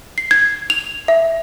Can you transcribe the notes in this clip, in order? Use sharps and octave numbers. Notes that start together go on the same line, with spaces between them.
C7
G#6
F7
E5